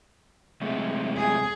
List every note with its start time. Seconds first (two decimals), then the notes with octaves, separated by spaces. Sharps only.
0.61 C3 G#3 A3
1.17 G#4